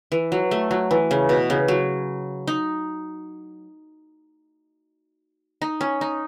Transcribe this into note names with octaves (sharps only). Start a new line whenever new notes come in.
E3
F#3
A3
F#3
E3
C#3
B2
C#3
F#3
D#4
D#4
C#4
D#4